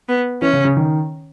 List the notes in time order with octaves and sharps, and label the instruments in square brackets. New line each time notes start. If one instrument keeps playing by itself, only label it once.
[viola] B3
[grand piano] E3 [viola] C#4
[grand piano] C#3
C#3
D#3